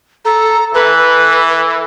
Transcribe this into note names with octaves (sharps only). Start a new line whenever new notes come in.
A4 A#5
E3 A4 B4